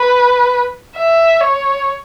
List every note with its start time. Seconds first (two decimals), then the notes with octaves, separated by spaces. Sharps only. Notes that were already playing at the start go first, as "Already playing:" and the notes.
Already playing: B4
0.96 E5
1.41 C#5